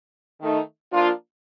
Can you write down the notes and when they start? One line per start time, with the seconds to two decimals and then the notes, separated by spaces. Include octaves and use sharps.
0.41 D#3 A3 D#4
0.92 F3 A#3 D4 F4